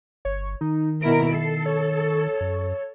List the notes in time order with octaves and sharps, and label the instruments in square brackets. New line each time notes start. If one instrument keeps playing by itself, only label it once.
[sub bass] G1 [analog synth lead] C#5
[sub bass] D#3 [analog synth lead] D#4
[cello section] B2 E4 A#4 [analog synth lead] D7
[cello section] A4 [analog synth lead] C7
[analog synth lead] C#5
[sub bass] F#2